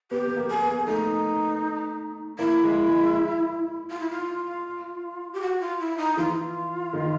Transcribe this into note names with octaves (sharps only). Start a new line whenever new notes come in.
B3 G4
B3
A#3
G#4
B3
A3 D#4
A#3 E4
G#3
G#3
F4
E4
F4
G4
F#4
F4
E4
D#4
E3 F4
D#3